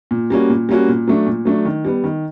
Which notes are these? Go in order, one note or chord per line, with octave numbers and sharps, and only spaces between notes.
A#2
G3 A#3 C#4 F#4
A#2
G3 A#3 C#4 F#4
A#2
F#3 A3 D4
A#2
F#3 A3 D4
D#3
G3 B3
D#3